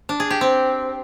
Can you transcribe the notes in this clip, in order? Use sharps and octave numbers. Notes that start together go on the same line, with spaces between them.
D4
G#4
G4
C4